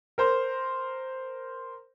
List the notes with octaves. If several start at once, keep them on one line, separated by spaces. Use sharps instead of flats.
A#4 C5